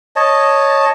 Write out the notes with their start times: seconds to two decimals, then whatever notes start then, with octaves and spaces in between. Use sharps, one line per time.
0.16 C#5 D#5 A5